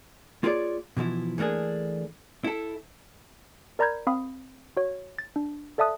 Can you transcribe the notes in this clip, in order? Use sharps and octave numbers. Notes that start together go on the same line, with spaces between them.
A#3 F4 G#4 C#5 D5
B2 E3 F3 E4
E3 A3 A#3 D4 G#4
E4 A4
A#4 D5 A#5 B5 G6 G#6
C4 F5 B5 D#6
F#4 C#5
A6
D4
A4 D5 E5 A5 D#6 F#6